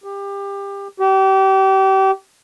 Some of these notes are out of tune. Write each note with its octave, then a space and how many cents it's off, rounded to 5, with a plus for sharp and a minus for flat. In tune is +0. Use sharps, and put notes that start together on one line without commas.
G4 +25
G4 -30